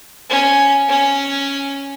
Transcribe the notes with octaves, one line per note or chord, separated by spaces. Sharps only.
C#4
C#4